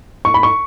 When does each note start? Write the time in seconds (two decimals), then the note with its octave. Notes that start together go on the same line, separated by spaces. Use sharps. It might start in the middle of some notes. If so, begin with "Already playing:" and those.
0.25 C#6
0.34 B5
0.43 C#6